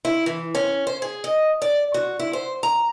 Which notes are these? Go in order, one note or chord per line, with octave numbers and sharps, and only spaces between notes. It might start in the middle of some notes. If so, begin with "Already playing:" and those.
E4
E3
C#4
C5
G#4
D#5
D5
F#4
E4
C5
A#5